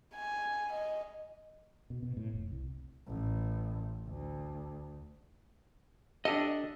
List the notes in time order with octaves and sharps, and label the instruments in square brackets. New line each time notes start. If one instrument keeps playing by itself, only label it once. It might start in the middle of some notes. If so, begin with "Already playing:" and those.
[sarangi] G#5
D#5
[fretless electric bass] B2
B2
A2
F1
C2
[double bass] A1
D2
[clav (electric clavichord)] D4 G4 A4 [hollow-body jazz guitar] D#5